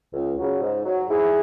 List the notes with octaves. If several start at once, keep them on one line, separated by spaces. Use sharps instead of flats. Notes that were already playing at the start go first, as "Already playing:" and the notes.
C#2
C#3 F#3
G#2
F#3
G#2 E4 G#4